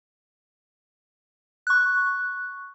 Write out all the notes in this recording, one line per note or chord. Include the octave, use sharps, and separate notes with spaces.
C#6 F#6